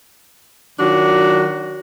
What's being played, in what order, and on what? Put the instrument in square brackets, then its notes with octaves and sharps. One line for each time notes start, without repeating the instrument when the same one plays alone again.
[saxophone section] D#3 F#3 D4 F4 F#4